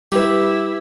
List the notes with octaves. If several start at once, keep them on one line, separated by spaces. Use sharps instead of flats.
G3 E4 G4 B4